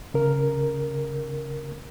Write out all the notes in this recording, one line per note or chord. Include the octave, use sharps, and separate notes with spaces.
C#3 A#4